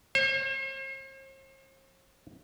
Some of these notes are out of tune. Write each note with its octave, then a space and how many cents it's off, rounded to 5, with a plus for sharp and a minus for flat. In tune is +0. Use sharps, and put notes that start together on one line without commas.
C5 +45